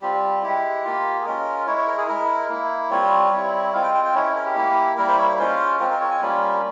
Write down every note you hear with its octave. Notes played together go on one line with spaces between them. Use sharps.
G3 C4 F4 G4
G#3 E4 G4
A#3 F4
G#4
G#3 C#4 F4 A#4
G#3 E4 C#5
C#5
A#4
G#4
G#3 E4 A#4
A#3 E4
G3 C4 F4 C#5
G3 C4 E4
G#3 C4 F4 F5
G5
G5
G5
G#3 C#4 E4 C#5
C#5
A#4
G4
A#3 E4
G3 A#3 E4 A#4
C5
C#5
C5
G#3 C#4 F4 C5
G#3 C4 F4 A#4
A#4
C#5
G#5
G3 A#3 C#4 F4